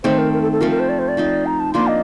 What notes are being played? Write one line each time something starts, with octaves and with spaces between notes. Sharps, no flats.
D#3 A3 C4 C5
A#4
A#4
A4
A4
F3 A3 C4 A#4
A#4
C5
D5
C5
D5
F3 C4 D#4
A#5
A5
F3 A#3 D4 C6
D#5